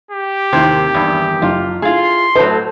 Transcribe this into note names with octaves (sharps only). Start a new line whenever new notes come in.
G4
D#2 C3 D#3 C4 E4 G#6
E2 G2
F#1 F4
E4 F4 G#4 C6
A2 F#3 A4 C5